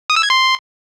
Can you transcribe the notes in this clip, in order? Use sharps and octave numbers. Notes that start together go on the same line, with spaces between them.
D#6
E6
G#6
C6